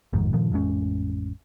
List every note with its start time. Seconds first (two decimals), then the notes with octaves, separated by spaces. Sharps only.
0.13 A1 F2 G#2 D#3
0.33 G2 A#2 D#3 F3
0.52 A1 F2 G#3 C#4